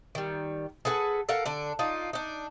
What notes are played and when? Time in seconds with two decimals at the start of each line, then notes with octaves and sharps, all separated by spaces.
0.15 D#3 G3
0.85 G#4 A4 B4 F#5
1.29 A4 A#4 F5 F#5
1.46 D3 D4
1.79 D4 D#4 F4
2.13 D4 D#4